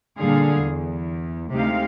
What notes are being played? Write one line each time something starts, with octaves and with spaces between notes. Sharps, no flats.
A#2 D3 G3 G#4 F5
E2
D2 C3 G#3 D#4 G4 F5